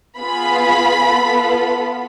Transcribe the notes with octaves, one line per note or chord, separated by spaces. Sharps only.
B3 F4 G#4 B5
B3 F4 A4